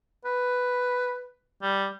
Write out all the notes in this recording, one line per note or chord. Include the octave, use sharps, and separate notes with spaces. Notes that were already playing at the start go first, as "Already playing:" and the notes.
B4
G3